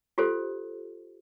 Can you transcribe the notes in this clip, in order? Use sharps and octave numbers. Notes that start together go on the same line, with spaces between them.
F4 G4 A4 C5